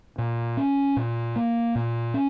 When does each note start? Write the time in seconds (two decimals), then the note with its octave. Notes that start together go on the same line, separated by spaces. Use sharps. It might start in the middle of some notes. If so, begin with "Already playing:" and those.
0.18 A#2
0.57 C#4
0.97 A#2
1.36 A#3
1.75 A#2
2.14 C#4